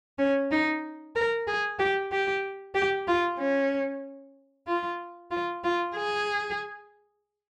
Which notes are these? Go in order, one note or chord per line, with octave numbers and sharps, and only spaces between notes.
C#4
D#4
A#4
G#4
G4
G4
G4
F4
C#4
F4
F4
F4
G#4